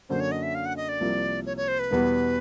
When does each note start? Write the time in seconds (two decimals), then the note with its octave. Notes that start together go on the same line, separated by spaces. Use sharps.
0.09 F#2 D3 F#3 A#3 C#4 C5
0.20 C#5
0.32 D#5
0.43 E5
0.55 F5
0.66 F#5
0.77 D#5
0.89 D5
1.00 C2 C3 F3 A#3
1.46 C#5
1.57 C#5
1.68 C5
1.79 B4
1.91 E2 B2 G3 B3